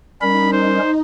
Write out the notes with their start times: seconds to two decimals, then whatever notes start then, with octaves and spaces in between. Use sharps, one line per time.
0.22 G3 C#4 D#4 A#4 B5
0.53 C5